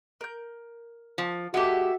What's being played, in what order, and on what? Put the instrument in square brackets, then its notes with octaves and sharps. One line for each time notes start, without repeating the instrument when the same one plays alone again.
[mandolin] A#4 G6
[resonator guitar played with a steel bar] F3
[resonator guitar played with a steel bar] G#3 G4 [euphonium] F#4 [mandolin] A4 E5 F#5